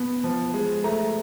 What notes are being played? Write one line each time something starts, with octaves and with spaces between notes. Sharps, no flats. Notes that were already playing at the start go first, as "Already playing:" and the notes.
Already playing: B2 B3
F3
G#3
A3 A#5